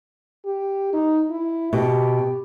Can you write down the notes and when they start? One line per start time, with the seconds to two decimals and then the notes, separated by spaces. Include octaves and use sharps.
0.45 G4
0.93 D#4
1.31 E4
1.73 B2 G4